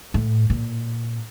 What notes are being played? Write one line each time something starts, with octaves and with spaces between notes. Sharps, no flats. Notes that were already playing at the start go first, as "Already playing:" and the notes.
A2
A#2